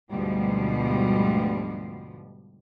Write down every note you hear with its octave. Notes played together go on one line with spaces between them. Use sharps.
D2 G#2 B2 F3 G3